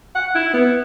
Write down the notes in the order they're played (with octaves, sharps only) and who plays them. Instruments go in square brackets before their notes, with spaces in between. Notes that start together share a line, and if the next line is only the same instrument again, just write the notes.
[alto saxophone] F#5
E4
B3